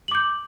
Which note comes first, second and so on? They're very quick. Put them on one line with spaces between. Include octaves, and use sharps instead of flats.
F#7 D6 G6